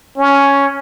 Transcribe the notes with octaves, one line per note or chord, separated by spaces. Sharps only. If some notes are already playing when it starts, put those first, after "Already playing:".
C#4